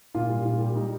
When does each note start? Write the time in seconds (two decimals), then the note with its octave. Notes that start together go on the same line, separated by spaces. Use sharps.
0.14 A#2 F4
0.29 G3
0.45 A#2
0.60 G3
0.75 G3 D#4